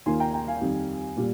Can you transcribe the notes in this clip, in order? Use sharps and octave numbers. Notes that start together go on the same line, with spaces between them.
D#2 D#3 A#3 F4 G#5 C6
G5 A#5
G5 A#5
F5 G#5
F2 D#3 G3
A#2 G3